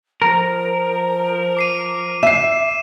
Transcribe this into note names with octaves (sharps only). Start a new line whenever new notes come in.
F3 A#4
D6 C7 D#7
E5 C7 E7